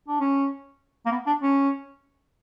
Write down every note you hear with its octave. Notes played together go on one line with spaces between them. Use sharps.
D4
C#4
A#3
B3
D4
C#4